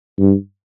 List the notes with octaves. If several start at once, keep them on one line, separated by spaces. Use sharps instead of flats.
G2